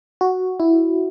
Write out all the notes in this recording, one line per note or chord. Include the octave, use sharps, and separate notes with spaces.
F#4
E4